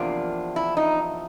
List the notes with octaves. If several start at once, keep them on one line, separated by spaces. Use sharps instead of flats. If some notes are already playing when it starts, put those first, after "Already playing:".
Already playing: E2 C3 F3 A#3 D4 F4
E4
D#4